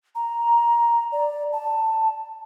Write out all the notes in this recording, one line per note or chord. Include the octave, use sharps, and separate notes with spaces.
A#5
D5
A5